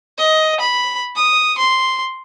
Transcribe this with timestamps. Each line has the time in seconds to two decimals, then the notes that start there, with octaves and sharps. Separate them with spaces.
0.18 D#5
0.60 B5
1.16 D#6
1.57 C6